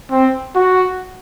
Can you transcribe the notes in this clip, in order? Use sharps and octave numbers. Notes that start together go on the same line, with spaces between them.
C4
F#4